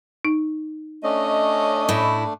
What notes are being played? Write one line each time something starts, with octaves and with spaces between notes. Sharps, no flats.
D#4
A3 C#4 D4 D#5
A2 E4